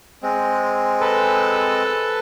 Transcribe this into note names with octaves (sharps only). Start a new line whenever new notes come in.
G#3 C4
A4 B4